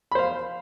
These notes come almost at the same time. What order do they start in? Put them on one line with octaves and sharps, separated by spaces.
B5 C5 F5